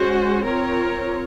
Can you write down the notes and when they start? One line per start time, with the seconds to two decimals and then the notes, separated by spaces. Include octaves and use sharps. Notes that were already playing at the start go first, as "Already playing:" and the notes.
Already playing: G#3 C#4 F#4 C5
0.45 C4 F4 A#4 C#5